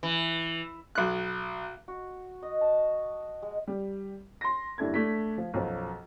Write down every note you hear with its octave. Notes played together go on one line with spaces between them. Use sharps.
E3
B1 F#6
F#4
D#5
A5
G#3
G3
C6 A#6
F#1 G2 D4 E4 A4 G#6
A3 D4 B6
F3
B1 F#2 F3